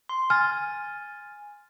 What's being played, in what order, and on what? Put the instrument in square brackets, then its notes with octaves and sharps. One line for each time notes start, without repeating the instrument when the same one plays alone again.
[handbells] C6
[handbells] G#5 A6 [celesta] F6